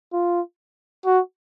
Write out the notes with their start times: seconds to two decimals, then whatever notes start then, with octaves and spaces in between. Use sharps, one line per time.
0.13 F4
1.06 F#4